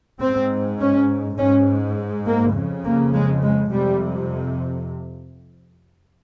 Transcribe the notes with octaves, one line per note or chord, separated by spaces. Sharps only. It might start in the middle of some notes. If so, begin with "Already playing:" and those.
G#2 C4
C#4
G#2 C#4
A#3
F2 C#3
A#3
G#3
G#3
F2 C3 G3